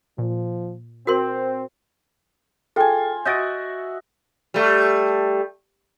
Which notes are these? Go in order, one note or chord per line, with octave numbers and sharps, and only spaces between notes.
A#2 F3
C4 F#4 A#4 C5 C6
F4 G#4 A4 G5 G#5
F#4 D#5 E5 G6 A6 D7
G3 A3